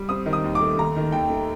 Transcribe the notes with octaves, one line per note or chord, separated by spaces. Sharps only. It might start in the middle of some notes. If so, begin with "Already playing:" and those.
Already playing: G3
C4 D#6
D#3
D#6
D#2
D6
A3
D#2 A#5
D#3
D#2 G5
A3